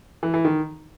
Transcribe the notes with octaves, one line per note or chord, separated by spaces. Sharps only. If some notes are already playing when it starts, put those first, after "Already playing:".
E3
E3
D#3